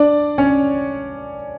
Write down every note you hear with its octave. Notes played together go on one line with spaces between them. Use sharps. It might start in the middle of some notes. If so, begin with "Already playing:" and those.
Already playing: D4 D5
C#4 C#5